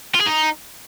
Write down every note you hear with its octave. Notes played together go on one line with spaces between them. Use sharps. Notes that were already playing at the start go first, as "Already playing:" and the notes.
F4
G#4
D#4